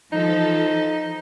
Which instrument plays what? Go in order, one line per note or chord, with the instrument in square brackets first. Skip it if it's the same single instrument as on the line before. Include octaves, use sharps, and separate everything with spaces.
[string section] E3 F3 A4 [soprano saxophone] D#4